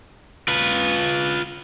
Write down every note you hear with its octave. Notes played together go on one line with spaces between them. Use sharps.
F4 B4